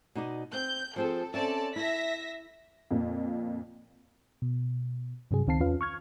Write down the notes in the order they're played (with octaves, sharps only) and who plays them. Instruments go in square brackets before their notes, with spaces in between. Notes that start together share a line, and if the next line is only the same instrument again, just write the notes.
[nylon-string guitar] B2 D#4 D5
[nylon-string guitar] C4 [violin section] G6
[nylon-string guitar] F3 C4 G#4 [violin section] A4
[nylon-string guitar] C4 C#4 E5 [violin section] A4 D5 A5
[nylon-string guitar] E4 [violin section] E5 A#6 B6
[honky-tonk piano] F2 A#2
[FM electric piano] B2
G2 C3 F#3 G#4
C#2 D#3 C4 F5 A5 C7
E2 C#4 F4 B4 F5
C#6 F6 G#6